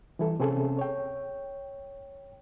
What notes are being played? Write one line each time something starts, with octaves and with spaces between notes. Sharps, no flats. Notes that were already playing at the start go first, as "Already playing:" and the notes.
E3 G3 E4 A4
C3 C4 C#4 G#4 A4
C#5 G5